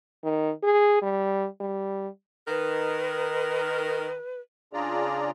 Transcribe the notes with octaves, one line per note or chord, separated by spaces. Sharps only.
D#3
G#4
G3
G3
D#3 A#4 B4
C#3 D4 F4 G#4 D5 A#5